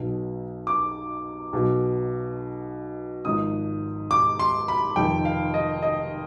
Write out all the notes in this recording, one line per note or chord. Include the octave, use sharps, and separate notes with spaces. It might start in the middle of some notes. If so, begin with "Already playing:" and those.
Already playing: B1 B2
D6
B1 B2
G#1 G#2 F3 D#6
D6
C6
B5
F1 F2 D#3 G5
F5
D#5
D#5